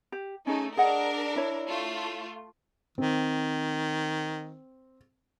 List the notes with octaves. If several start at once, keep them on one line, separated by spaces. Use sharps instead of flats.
G4
A3 C#4 D#4 G#4
D4 G#4 A#4 D#5 F#5
E4 C#5
A3 F4
D#3 C4